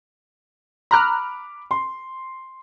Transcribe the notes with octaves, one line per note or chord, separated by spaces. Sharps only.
A#5 B5 D6 F6 F#6
C6